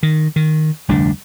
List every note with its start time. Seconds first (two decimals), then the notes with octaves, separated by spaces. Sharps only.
0.03 D#3
0.36 D#3
0.88 F1 D2 G3 D4